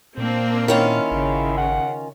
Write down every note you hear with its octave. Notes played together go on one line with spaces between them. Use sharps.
A#2 A#3 C4 D4
D#3 C#4 E4 F4
G#1 C#3
F#5